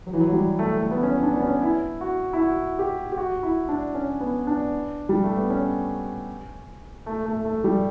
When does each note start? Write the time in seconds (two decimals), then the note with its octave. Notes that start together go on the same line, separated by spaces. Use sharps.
0.07 F#3
0.13 E3
0.21 F#3
0.32 G3
0.59 A3
0.78 A3
0.91 B3
1.03 C#4
1.23 D4
1.34 B3
1.42 C#4
1.62 E4
2.01 F#4
2.33 E4
2.40 F#4
2.79 G4
3.12 G4
3.17 F#4
3.43 E4
3.69 D4
3.95 C#4
4.20 B3
4.47 D4
5.09 G3
5.23 A3
5.37 B3
5.50 C#4
7.06 A3
7.26 A3
7.45 A3
7.64 G3